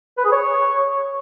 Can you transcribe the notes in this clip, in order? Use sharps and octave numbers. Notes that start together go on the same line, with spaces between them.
B4
G#4
C#5